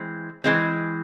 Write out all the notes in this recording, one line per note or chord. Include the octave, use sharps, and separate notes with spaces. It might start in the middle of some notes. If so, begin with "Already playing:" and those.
Already playing: E3 G#3 C4
E3 G#3 C4